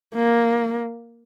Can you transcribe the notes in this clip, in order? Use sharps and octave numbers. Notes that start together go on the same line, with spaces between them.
A#3